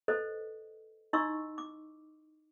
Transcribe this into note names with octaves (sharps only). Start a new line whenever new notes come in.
A4 B4 C5 D#5
D#4 E4 D#5 C6 C#6 E6
D6